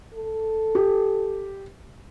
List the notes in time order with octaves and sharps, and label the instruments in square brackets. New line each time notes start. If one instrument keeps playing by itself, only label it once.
[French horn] A4
[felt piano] G4